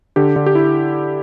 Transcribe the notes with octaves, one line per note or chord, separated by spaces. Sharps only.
D3 G4
D3
G4
E4